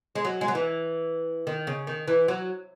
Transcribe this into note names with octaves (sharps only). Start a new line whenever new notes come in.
G#3
F#3
G#3
F#3
E3
D#3
C#3
D#3
E3
F#3